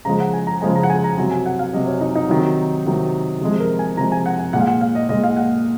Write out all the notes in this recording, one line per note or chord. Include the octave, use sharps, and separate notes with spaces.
C#3 F3 G#3 A#5
F#5
G#5
A#5
C#3 F3 G#3 G#5
A#5
F#5
G#5
A#5
C3 F#3 G#5
G#5
F#5
F5
C3 F#3 D#5
C#5
D#4
D#4
C3 D#3 F#3
C3 D#3 F#3
C3 F3 G#3
A#4
G#5
C3 F3 G#3 A#5
G#5
F#5
G#5
A#2 G#3 F#5
F5
F#5
F5
D#5
A#2 G#3 D#5
F5
F#5